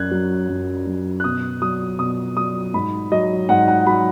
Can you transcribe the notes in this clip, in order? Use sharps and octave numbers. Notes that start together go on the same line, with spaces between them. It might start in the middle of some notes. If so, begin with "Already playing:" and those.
Already playing: F#2 F#6 G#6
F#3
F#2
F#3
F#6
B2 D#6
F#3 D#6
B2 D#6
F#3 D#6
G#2 B5
F#3 D#5
G#2 F#5
F#5
F#3 B5